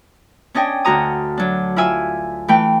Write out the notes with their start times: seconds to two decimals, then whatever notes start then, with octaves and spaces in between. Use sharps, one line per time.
0.54 C#4 D4 D#5 G5 G#5
0.85 D2 F#4 A#5 D#6
1.37 F#3 D4
1.76 E4 F4 E5 G#5 E6
2.48 E3 A3 B4 G5